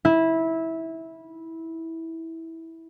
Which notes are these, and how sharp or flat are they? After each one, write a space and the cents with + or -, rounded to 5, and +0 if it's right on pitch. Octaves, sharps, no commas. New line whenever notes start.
E4 -15